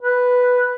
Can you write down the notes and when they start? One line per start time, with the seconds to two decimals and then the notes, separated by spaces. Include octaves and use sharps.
0.01 B4